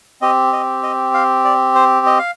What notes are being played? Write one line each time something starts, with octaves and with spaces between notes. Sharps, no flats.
C4 G4 D#5
D#5
D#5
F5
D5
C5
D#5
F5